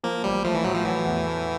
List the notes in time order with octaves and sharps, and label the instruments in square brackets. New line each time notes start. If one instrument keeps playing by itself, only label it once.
[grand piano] F3 [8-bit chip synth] A#3
[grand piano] A1 [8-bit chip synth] G3
[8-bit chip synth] F3 [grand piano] A3
[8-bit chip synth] E3
[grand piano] A2 [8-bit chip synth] F#3
[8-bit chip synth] F3
[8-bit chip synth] E3 [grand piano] F#3
[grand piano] E2
A3